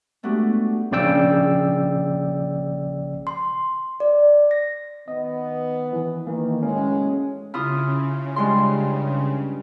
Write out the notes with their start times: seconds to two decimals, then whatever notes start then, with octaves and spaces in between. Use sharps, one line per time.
0.23 G#3 A3 B3 D4 F#4 G4
0.92 A#1 C#3 D5 G5 E6
3.27 C6
4.00 D5
4.51 A#6
5.08 D#3 B3 D#5
5.93 E3
6.27 D#3 E3 A#3
6.63 F#1 A2 G#3 C#4
7.54 C#3 E4 F4 D#6
8.36 G2 G#3 C6